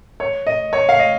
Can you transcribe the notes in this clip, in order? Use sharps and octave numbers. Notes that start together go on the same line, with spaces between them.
C#5
D#5
C#5
F5
D#5